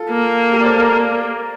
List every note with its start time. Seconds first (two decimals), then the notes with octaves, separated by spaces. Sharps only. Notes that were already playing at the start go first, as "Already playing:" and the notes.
Already playing: F4 A4
0.10 A#3
0.52 G4 A#4
0.60 D5
0.65 A4 C5
0.79 A#4 D5